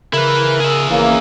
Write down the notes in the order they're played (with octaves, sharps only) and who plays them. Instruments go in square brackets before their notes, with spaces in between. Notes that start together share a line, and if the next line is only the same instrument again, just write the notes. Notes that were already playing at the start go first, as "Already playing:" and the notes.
[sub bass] C#3 [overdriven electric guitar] E4 B4 [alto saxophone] A#4
[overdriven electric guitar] G#4 E5
[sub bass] G#1 [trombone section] C#3 A#3 [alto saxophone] E3